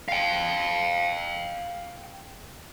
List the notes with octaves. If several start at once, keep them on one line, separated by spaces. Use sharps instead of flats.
F5 G5